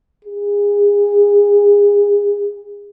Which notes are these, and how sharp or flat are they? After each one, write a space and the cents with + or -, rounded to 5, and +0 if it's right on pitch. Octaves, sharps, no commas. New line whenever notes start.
G#4 -30